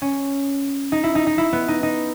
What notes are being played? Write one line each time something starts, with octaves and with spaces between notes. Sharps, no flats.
C#4
D#4
E4
D#4
D#4
E4
B3
D#4
D#4